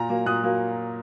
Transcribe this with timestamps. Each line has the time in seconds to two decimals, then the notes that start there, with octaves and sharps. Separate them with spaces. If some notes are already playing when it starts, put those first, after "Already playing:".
Already playing: A#2 A#5
0.09 F#3 A#3
0.26 A#2 D#6 F#6
0.42 F#3 A#3